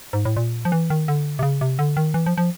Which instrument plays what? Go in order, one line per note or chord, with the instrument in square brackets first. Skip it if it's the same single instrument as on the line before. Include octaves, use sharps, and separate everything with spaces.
[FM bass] G#2
A2
A#2
F3
E3
D#3
D3
C3
C#3
C3
D3
D#3
E3
F3
F3